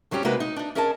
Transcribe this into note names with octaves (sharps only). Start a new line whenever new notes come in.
F2 F#3 G3 C#4 G4
C3 G#3 A#3 D#4 F#4 B4
D#4
D4 D#4
C#4 G#4 A#4 D#5 F#5 A5